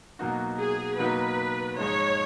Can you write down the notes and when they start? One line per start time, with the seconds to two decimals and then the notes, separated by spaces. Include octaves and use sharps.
0.19 B2 F#3 A#3 D#4 F#4
0.60 G#4
0.98 B2 F#3 A#3 D#4 F#4 B4
1.78 G#2 F3 G#3 D#4 C#5